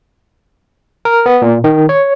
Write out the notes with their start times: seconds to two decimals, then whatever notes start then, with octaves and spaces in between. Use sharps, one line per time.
1.05 A#4
1.26 B3
1.42 A#2
1.64 D#3
1.89 C#5